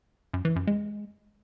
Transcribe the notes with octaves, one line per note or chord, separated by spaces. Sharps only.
F#2
E3
F#2
G#3